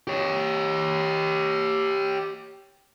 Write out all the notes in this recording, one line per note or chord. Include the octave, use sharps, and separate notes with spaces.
G4 C#5